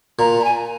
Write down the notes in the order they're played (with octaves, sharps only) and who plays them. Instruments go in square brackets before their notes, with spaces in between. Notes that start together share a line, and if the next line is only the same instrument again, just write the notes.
[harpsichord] A#2 [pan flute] A#5
[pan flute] A#5
G#5